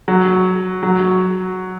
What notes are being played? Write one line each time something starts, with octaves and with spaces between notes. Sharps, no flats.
F#3
F#3